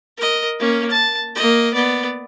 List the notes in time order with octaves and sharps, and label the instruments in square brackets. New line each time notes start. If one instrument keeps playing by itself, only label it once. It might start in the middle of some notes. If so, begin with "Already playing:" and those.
[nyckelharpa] A#4 D#5
A#3 C#4
A5
A#3 D#5
B3 D5